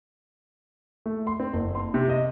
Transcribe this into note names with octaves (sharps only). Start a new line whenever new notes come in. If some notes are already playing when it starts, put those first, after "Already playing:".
A3
C6
C4
F#1
C6
C3
D#5